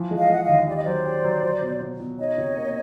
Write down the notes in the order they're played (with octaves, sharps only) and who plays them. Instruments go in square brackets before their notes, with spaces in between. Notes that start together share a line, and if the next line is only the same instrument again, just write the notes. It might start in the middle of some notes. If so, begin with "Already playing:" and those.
Already playing: [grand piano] E3 F3
G#3
[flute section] D#5 F5
[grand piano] G#3 [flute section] F#5
[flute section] D#5 F5
[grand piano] D#2
[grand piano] G4 [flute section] D5
[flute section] D#5
[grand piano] F#3 [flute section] C5 D5
[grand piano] G4
F#3
F#3
B2
B2
B2
[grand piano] D#4 [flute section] C#5 D#5
[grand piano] C3
A#3